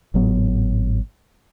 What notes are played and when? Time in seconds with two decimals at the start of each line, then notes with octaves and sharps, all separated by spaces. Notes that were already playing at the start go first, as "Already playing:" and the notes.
0.14 G#1 A2 F#3 B3